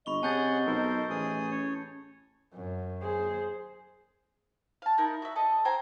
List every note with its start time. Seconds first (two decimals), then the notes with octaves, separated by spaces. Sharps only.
0.06 G1 D#5 B5 C#6 G7
0.23 C3 C#4 G#4 F#5 A5 G6 A6
0.66 B1 A4 A#4 C5
1.10 A1 G#4 D#6
1.51 C#4 C#5
2.54 F#2
3.02 G#4 C5
4.82 F5 A5
4.98 D#4 E4 A#4
5.22 F#4 E5
5.36 A4 D#5
5.65 C5 G5 G#5 A#5